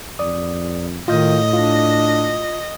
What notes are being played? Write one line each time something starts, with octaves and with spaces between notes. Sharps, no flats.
F2 D5 D#6
A2 D#3 F4 D#5 F5 G6
D4 F4